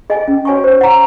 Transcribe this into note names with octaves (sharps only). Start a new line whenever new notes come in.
G#4 D#5 G#5
C#4
F#4 C#5 G#5 C#6
C5
F#5 A#5 C#6